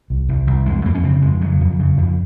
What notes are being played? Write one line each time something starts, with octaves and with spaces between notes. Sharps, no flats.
C2
C2
C2
F2 G#3
F2 A#3
C#4
C#3 C4
F2 G#3
C#3 F#3
F2
C#3
F2